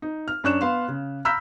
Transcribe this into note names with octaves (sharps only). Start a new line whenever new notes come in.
D#4
F6
F#2 C#4 D4 C#6 F#6 E7
B3 F5 C6
C#3
A#5 B5 E6 F6 G6 B6